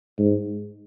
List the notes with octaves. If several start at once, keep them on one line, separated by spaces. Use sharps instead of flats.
G#2